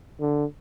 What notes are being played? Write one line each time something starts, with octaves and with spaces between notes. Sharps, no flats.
D3